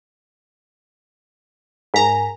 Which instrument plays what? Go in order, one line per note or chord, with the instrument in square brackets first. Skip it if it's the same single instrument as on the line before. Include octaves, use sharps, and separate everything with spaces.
[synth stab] G#2 A#5 [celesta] A#4 G#5 B6